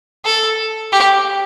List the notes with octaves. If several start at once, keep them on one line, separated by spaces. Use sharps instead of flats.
A4
G4